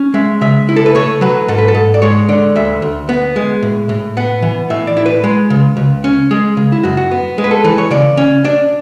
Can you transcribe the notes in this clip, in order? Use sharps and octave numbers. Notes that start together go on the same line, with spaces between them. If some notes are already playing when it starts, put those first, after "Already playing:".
Already playing: C#4
G#3 E5
C#3 E5
E4
A4
B4
A3 C#5
F#3 B4
G#2 A4
B4
A4
G#2
D5
G#3 C#5
D3 D5
D2 E5
D2
B3
G#3
A2
A2
B3 F#5
E3
A2 E5
D5
E4
B4
G#3
C#3
C#2
C#4
G#3 G#4
C#3
E4
F#2 F#4
F#4
B3
G#3
B4
A4
E3 B4
C#5
C#3 D5
C#4
D4 D5